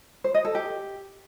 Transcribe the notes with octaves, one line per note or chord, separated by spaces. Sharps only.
C5
D#5
A4
G4